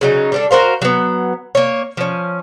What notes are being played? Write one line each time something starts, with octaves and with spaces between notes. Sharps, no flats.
C#3 F#3 D#4
G3 D4 A4
F#4 A#4 C5 F5
F#3 B3
A#3 C#5
F3 C#4